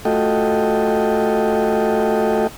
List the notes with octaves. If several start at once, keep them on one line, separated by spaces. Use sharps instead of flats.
A3 F4 F#4 A4 D#5 G5